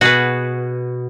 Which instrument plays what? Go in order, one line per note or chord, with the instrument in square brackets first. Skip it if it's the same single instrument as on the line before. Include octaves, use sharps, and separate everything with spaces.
[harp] B2 [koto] F#4 G#4 B4